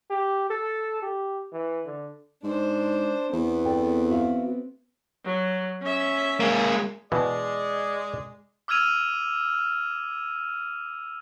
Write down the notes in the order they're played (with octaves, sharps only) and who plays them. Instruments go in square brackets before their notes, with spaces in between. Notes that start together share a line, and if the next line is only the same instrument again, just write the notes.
[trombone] G4
A4
G4
E3
D3
[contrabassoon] G#2 [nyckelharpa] D4 C5
[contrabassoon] E2 [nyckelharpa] B3 C4
[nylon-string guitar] A4 D5 G5
F#4 E5 F5
[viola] F#3
C#4 E5
[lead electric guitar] G#3 A#3
[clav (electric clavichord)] B2 E3 [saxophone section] G#3 [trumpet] D5
[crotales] D6 E6 F6 G#6 D#7 F7